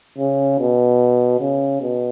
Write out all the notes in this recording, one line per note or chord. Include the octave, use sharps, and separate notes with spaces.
C#3
B2
C#3
B2